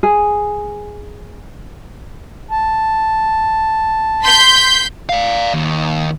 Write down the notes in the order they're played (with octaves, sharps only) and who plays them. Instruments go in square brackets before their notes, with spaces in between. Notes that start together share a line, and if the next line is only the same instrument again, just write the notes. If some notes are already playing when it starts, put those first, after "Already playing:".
[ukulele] G#4
[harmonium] A5
[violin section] C6 G6 B6
[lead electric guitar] D5 F5
D#2